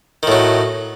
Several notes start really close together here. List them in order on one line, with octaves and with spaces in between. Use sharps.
D#3 A2 F#3